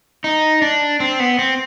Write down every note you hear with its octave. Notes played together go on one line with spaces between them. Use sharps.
D#4
D4
C4
B3
C4